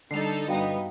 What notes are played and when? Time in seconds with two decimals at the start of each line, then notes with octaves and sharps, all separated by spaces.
0.11 D3 G3 D#4 A4 C7 F7
0.48 G2 B3 D#4 F#4 F5 G5